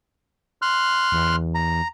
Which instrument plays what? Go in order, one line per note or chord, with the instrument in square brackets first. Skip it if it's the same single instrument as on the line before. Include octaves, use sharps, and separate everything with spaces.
[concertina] C6 F6 F#6
[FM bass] E2
[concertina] A#5